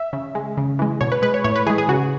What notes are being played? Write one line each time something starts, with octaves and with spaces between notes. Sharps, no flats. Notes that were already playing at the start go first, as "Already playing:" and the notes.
Already playing: E5
C#3
G#3
C#3
E3 G#3
B2 C#5
B4
G#3 B4
C#5
A2 C#5
B4
E3 G#3 G#4
G#4
C#3 F#4